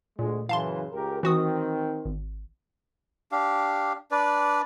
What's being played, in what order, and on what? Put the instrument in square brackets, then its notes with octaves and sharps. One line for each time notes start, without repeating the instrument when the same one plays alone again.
[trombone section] D2 G#3 [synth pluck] A#2
[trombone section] F#2 C#3 E3 [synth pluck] F5 A5 C6
[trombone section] C#2 G4 A#4
[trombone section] D#3 C4 [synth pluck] E3 F#4 D#6
[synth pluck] G#1
[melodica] D4 G4 F5
D4 B4 D5